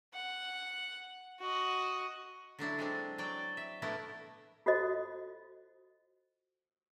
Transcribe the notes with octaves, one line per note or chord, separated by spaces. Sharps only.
F#5
F#4 D#5
D3 F#3 D4 E4
F#3 G#3 C4 D4
F#3 D5 G5
E5
A#2 A3 B3 D4 E4 A#4
F4 F#4 A4 C5 D#5